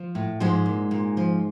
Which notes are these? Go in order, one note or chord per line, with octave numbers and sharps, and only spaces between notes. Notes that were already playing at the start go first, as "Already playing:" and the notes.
Already playing: F3
A2
G#2 F3 G#3
A#2
A#2
F3